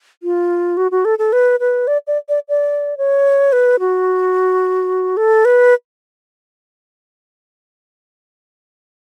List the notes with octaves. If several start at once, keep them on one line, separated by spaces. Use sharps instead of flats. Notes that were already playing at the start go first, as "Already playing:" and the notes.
F4
F#4
F#4
A4
A4
B4
B4
D5
D5
D5
D5
C#5
B4
F#4
A4
B4